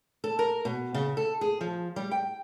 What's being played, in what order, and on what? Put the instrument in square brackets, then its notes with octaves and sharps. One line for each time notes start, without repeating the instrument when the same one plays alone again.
[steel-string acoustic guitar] A4
A#4
B2
C#3
A4
G#4
F3
G3
G5